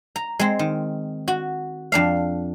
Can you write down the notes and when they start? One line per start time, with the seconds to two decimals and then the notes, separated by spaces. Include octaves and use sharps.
0.16 A#5
0.39 G#3 C4
0.59 D#3
1.28 F#4
1.92 F2 D4 F5